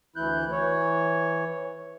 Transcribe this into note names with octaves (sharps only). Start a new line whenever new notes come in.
D2 E3 E4 F#6 G6
E3 C#5